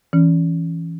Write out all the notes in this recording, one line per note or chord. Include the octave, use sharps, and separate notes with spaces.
E3 C#4